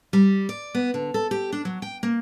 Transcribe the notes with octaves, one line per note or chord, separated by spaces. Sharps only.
G3
D5
B3
D3
A4
G4
D4
F#3
G5
A#3